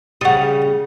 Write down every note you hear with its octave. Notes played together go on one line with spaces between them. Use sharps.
C#3 G3 F#5 D#6